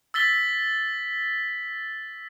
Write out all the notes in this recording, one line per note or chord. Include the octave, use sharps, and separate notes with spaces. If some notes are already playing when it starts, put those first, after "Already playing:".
E6 A6 B6 G7